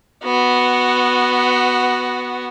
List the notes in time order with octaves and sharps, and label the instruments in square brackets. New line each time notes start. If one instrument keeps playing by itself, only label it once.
[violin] B3 F#4